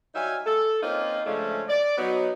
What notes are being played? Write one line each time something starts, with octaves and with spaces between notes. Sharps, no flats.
F#3 G3 D#4 E5 F5 G#5
A4
A#3 C4 C#4 D#4 F4
C#3 F3 G#3 A3 C#4 D4
D5
F#3 B3 D#4